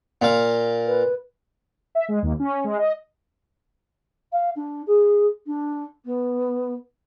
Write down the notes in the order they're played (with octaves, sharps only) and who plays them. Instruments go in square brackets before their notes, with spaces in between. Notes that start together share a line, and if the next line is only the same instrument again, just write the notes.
[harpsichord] A#2 F5
[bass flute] B4
[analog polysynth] E5
G#3
D#2
C#4
G#3
D#5
[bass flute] F5
D4
G#4
D4
B3